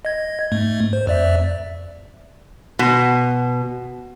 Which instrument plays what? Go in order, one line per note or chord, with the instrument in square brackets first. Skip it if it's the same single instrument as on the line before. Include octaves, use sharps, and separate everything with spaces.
[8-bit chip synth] D#5 G#6
G#2 A3
C5
F2 D5 E5
[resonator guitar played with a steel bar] B2